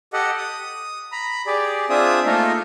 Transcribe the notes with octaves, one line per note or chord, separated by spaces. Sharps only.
G4 A4 D#5 F#5
D#6
A#5 B5
G4 G#4 D5
C4 D4 F4 G#4 E5 D#6
A3 A#3 D#4 F4 A4 A#4